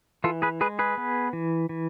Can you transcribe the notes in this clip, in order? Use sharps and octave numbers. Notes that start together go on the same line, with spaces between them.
E3 F4 A4
G#4 B4
G#3 G#4 B4
G#4 B4
B3
E3
E3